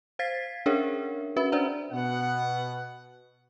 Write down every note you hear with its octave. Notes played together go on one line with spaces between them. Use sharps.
C5 F5 G#6 A6 B6 C7
C#4 D4 G#4 A#4 C#5 E5
C#4 F#4 B4 E5 B5
C#4 D4 C5 D5 E5 A#5
B2 B3 F#5